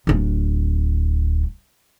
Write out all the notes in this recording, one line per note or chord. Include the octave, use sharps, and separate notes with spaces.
D1 D4